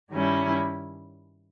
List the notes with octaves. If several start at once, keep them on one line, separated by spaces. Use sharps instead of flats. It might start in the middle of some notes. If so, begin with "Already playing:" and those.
G2 D#3 G3 C#4 E4